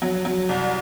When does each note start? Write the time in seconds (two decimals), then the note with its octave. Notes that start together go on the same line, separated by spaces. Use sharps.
0.02 F#3
0.25 F#3
0.49 C2